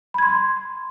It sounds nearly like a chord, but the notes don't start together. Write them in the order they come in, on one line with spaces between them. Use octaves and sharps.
B5 G#6 C6